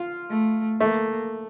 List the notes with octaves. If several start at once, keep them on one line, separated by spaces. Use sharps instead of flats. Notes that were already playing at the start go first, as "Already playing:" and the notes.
Already playing: F4
A3
A3 A#3